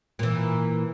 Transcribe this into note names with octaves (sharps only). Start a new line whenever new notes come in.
A#2 E3